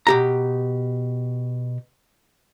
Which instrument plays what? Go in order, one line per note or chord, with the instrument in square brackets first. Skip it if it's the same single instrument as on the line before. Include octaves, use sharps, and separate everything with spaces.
[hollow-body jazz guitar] B2 G4 A#5